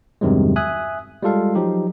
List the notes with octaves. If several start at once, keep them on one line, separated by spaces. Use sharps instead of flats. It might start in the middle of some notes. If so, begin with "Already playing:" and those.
E2 G2 C3 D#3 F#3 G#3
E5 G#5 D#6 F#6
G3 G#3 F4 A4 F5
F3 F#3 D#4 G4